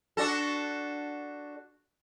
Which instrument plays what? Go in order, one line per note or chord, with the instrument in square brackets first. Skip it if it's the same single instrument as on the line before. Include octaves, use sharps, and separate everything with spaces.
[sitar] D4 F#4 A4